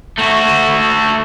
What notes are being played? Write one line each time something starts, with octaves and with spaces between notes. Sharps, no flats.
A3 F#4